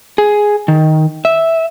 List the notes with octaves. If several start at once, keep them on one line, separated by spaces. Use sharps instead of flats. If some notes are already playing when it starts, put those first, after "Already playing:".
G#4
D#3
E5